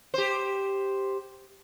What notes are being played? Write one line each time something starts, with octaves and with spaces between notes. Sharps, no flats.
G4 C5